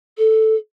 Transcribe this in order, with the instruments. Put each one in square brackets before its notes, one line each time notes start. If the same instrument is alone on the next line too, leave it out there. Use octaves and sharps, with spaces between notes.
[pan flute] A4